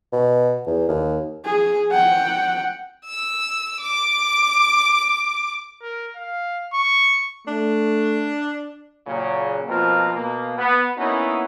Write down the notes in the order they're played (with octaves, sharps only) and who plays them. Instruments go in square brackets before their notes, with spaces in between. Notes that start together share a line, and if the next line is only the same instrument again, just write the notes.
[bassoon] B2
E2
D#2
[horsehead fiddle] G#4
F#5 G5
[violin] E6
D6
[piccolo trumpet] A#4
F5
C#6
[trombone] A3 [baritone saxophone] D4
[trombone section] A#2 C#3 F#3
B2 F3 A#3 C4 F4 A#4
B2 A#3
B3
A#3 B3 C#4 D#4 E4 F#4